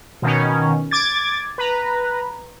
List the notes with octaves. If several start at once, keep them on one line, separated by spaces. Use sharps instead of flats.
B2 D#3 C#4
D6 G#6 A6
B4 A#5